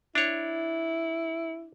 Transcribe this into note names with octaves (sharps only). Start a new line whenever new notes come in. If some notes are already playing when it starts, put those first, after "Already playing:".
D4 E4 C#5